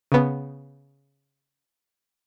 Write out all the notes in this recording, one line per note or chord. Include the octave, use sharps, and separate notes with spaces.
C#3 B3